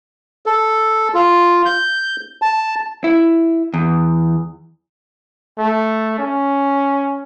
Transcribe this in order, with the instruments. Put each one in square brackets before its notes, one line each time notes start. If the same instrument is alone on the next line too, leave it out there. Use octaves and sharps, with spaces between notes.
[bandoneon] A4
F4
G6
A5
[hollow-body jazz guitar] E4
E2
[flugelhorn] A3
C#4